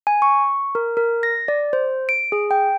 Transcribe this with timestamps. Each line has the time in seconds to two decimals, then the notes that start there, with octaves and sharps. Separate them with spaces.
0.07 G#5
0.22 C#6
0.75 A#4
0.97 A#4
1.23 A#6
1.48 D5
1.73 C5
2.09 D7
2.32 G#4
2.51 G5